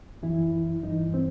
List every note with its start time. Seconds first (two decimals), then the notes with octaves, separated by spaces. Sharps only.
0.23 F#2 E3 E4
0.83 G2 E3 D#4
1.14 C4